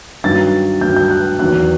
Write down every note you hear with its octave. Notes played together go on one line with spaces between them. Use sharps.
G2 D#3 F#3 A6
G2 D#3 F#3 G6
G6
F#6
E2 D#3 F#3 F#6